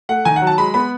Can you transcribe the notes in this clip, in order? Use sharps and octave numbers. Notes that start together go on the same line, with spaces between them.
A3 F#5
D#3 G#5
F#5
F#3
A5
G#3 B5
B3 B5